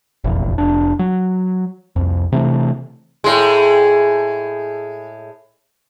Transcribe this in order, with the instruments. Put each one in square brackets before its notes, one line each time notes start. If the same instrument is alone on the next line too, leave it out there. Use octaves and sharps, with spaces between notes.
[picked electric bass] F1 A#1 E2
F1 D4
F#3
C2 F2
C3 E3 A3
[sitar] A2 G#3